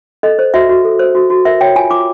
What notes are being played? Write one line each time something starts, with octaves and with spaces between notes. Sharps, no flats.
A4 D#5
C5
F#4 E5
F#4
A4
C5
F#4
F#4
A#4 E5
C#5 G5
F4 G#5
F4 D6